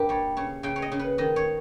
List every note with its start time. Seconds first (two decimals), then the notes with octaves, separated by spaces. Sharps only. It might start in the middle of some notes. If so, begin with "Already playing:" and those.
Already playing: G2 A#3 G4
0.09 G3 C#5
0.37 C#3 C#5
0.63 C#3 G5
0.76 C#5
0.82 D#5
0.92 C#3
0.99 B4
1.18 D#3 D#5
1.36 C#5